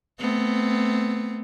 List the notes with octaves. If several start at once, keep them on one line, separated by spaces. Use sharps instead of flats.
A3 B3 C4